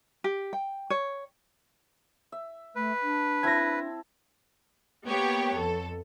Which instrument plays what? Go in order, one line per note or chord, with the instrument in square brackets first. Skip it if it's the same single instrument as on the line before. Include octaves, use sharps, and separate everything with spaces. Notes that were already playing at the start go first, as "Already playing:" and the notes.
[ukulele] G4
G5
C#5
[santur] E5
[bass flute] A3 [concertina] B4
[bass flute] D4
[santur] C4 E4 A5 [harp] G#6 A#6
[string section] A#3 B3 G4 C#5
F2 A4